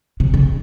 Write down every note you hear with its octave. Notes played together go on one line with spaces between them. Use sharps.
C3
C#3